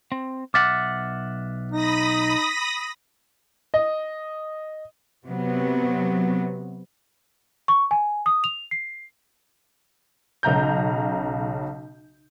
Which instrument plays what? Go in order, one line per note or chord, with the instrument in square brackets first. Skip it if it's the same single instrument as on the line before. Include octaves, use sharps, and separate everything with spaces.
[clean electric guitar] C4
[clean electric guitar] B1 E5 F#5 [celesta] D6 F6 A6
[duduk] D#4 [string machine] B5 D#6 A#6
[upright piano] D#5
[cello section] C3 F#3 B3
[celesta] C#6
G#5
D#6
F7
C7
[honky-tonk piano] B1 C#3 A#5 G6